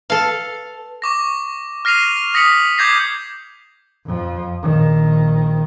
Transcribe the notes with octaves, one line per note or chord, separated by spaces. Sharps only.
A4 B4 F5 A5
C#6 D6 A#6
F6 A#6 C7 D#7 F7
D#6 A#6 B6 C#7 F#7
D6 G6 G#6 A#6 C7
F2 F3
A#1 D#3